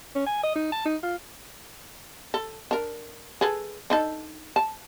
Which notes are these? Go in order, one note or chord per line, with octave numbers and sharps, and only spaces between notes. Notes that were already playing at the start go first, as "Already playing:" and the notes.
C#4
G#5
D#5
D#4
A5
D#4
F4
A4
D4 A#4
G#4 A4 B4
D4 D#4 A4
A5